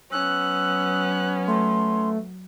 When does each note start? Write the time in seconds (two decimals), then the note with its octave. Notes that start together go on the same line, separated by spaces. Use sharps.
0.12 F#3 B3 C#4 E6 F#6
1.47 A3 C6